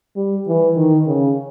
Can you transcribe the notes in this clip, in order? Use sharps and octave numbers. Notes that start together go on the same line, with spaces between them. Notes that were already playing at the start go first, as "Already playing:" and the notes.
G3
E3
D#3
C#3